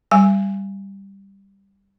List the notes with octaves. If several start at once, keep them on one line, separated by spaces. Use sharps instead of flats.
G3 G#5